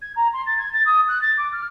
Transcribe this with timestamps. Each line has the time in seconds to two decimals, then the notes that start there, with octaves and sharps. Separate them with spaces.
0.02 G#6
0.16 A#5
0.33 C6
0.46 A6
0.58 G#6
0.73 A6
0.85 D#6
1.08 F#6
1.21 A6
1.37 D6
1.52 F6